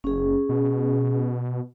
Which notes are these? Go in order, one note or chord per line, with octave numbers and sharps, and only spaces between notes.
F#1 C#4 G#4
B2